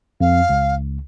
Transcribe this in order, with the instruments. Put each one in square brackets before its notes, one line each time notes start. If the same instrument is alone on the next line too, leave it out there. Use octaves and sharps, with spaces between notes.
[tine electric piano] F2 [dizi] F5
[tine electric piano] C#2